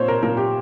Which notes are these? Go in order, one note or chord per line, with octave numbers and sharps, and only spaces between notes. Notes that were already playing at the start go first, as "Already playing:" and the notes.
Already playing: A#2 C4 C5 C#5
A#4
A#2 A#4
G4